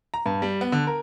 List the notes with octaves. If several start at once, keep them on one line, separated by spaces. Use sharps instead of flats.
A#5
G2
G3
B3
D3
A#4